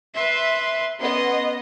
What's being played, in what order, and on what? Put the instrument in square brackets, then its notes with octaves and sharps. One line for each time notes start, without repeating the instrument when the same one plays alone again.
[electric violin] B4 C6 [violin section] E5
[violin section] B3 D#5 [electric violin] C#4 C6